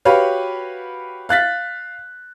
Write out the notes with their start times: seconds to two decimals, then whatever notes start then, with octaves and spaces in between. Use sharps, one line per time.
0.05 F#4 G4 B4 C#5 F5
1.29 F5 F#6 A6 B6